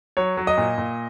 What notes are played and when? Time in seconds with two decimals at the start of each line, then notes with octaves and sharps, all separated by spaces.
0.17 F#3 C#5
0.37 F#3
0.47 D#5
0.58 A#2
0.78 A#2